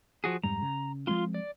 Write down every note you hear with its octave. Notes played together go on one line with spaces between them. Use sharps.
F3 F#4 G#4
F2 G#2 G3 A#5
C#3
F3 G#3 C4 F4 C6
D5